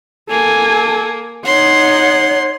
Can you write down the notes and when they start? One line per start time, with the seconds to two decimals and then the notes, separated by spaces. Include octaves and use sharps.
0.29 A#3 A4 G#5
1.45 D#4 C#5 F#5 C6